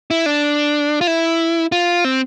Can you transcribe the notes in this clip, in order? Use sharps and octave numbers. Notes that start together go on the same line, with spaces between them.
E4
D4
F4
E4
F4
C4